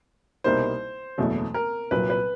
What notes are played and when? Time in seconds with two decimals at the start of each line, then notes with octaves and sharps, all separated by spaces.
0.44 C2 B2 G3 A#3 D#4 C5
1.18 F#1 E2 B2 F#3 A3
1.54 A#4
1.91 C2 A#2 F#3 B4
2.10 B4